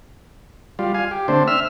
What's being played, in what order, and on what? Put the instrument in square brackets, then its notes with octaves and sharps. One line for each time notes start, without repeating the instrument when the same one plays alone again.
[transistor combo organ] G3 F4
F5 G#5
G4
D3 A3 C4 D4 C5
E5 E6 F6